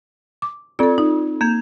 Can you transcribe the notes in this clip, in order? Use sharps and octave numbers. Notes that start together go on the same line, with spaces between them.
D6
C4 F4 A4 D5
D#4
A#3 G6 G#6